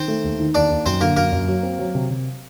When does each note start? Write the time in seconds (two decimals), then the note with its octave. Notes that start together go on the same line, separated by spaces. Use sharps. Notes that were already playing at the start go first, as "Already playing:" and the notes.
Already playing: D#3 C4 C5
0.08 A3
0.24 D#2
0.39 D#3
0.55 D#2 D4 D5
0.70 D#2
0.86 F#2 C4 C5
1.01 D3 A#3 A#4
1.16 F#2 A#3 A#4
1.32 F#2
1.48 F#3
1.63 C4
1.79 F#3
1.95 C3
2.10 C3